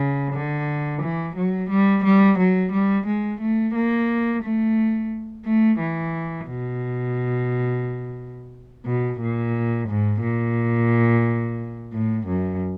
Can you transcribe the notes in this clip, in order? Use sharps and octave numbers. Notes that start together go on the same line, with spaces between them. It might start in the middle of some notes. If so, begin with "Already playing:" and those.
Already playing: C#3
D3
E3
F#3
G3
G3
F#3
G3
G#3
A3
A#3
A3
A3
E3
B2
B2
A#2
G#2
A#2
A2
F#2